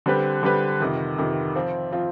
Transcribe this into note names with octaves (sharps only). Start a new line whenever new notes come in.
D3 G3 C4 G4 B4
D3 G3 C4 G4 B4
F2 C3 D#3
F2 C3 D#3
F3 C4 F4
F3 C4 F4